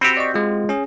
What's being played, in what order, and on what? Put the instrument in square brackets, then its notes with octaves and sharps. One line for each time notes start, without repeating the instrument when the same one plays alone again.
[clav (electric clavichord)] C4 F#4 G4 [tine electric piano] B5 E6
[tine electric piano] D5 D#5 C#6
G#3 F4
C#4 G#4